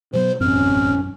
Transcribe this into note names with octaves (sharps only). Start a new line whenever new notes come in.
B2 F#3 B3 C5
E1 A1 F#2 C4 C#4 F6